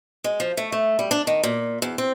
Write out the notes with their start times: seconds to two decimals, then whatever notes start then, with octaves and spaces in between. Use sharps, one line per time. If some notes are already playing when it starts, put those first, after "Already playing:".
0.24 G#3
0.40 F3
0.57 A3
0.72 A3
0.99 G3
1.11 D4
1.27 D#3
1.44 A#2
1.82 E2
1.98 C4